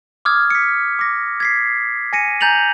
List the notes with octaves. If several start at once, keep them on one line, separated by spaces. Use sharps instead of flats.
D6 D#6 F6 G#6
B6 C#7
D6 A#6
G#6 B6 C7
G#5 A#6 C#7 D#7
G#5 A#5 G6 A6 F7 F#7